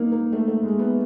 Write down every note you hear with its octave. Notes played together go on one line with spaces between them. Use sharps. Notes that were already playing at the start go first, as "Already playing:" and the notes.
Already playing: A#3 D#4
A#3
A3
A3
G#3
B3